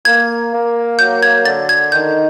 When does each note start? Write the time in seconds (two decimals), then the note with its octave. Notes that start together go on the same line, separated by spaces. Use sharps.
0.05 A#3 G#6
0.52 A#3
0.99 F#3 G6
1.23 G#6
1.45 D3 A6
1.69 G#6
1.92 D#3 G6